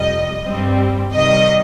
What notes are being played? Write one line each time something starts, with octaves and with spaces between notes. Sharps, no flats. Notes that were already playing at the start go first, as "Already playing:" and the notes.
Already playing: F2 C3 G3 D#5
G2 G3 C4
C3 D#3 G3 D#5